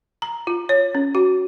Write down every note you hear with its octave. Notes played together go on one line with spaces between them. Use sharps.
A#5
F4
C#5
C#4
F#4